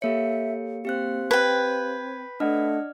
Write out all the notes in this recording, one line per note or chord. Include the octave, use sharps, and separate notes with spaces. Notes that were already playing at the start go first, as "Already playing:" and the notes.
A#3 G4 A4 C#5 E5 C#7
C4 G4 F5 F#6
B4 G5 G#6
A3 D4 D5 D#5 F#5 F6